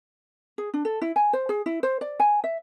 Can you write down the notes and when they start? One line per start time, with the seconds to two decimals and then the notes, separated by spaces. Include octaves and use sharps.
0.58 G#4
0.74 D4
0.85 A4
1.02 E4
1.16 G#5
1.33 C5
1.49 G#4
1.66 E4
1.83 C5
2.01 D5
2.20 G#5
2.44 E5